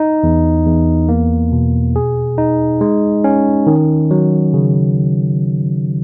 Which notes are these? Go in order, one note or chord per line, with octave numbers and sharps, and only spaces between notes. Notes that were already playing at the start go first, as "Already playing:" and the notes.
Already playing: D#4
E2
E2
A#3
B2
G#4
D#4
G#3
C#4
D#3
F#3
C#3